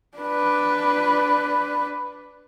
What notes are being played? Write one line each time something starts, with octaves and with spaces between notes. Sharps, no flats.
D4 B4